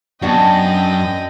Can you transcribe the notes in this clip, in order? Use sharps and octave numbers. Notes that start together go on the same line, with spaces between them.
F#2 B3 D4 F#4 D#5 G5